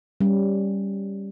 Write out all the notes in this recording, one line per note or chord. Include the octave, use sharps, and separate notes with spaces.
G3 C#4